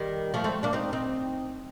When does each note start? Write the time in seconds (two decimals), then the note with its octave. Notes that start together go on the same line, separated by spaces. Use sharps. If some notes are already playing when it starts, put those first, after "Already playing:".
Already playing: D#3 G3
0.34 F3 A3
0.44 A3 C4
0.63 A#3 D4
0.73 C4 D#4
0.93 C4 D#4